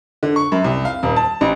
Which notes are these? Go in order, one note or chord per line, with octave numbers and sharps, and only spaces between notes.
D3
C#6
F#2
C2
F5
D#1
A5
A1